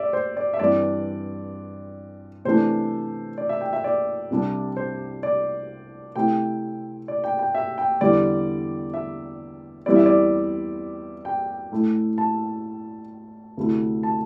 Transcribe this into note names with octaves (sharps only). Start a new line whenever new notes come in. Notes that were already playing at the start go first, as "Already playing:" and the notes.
Already playing: D5 E5
C5
D5
E5
G2 E3 C4 D5
C3 E3 A3 D4 C5
D5
E5
G5
E5
D5
C2 C3 G3 D4
C5
D5
C3 A3 C4 E4 G5
D5
G5
G5
E5
G5
E2 D3 G3 E4 D5
E5
E2 E3 G3 C4 E4 D5
E5
D5
G5
A2 A3 E4
A5
D2 C3 A3 E4
A5